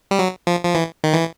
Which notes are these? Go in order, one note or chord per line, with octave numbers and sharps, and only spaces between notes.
G3
F#3
F3
F3
E3
D#3
E3